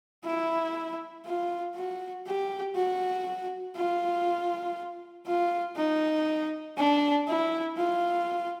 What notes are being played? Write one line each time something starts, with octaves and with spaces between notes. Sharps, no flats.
E4
F4
F#4
G4
F#4
F4
F4
D#4
D4
E4
F4